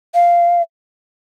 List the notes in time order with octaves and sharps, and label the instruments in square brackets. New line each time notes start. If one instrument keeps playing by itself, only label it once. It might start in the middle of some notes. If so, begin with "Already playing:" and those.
[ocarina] F5